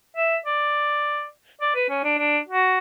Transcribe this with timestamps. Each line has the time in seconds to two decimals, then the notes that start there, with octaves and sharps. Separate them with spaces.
0.16 E5
0.46 D5
1.61 D5
1.75 B4
1.89 C#4
2.04 D4
2.18 D4
2.48 F#4